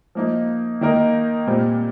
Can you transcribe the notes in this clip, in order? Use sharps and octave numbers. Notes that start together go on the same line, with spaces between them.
F3 A#3 D#4
D#3 A#3 D#4 A#4
A#2 G3 C4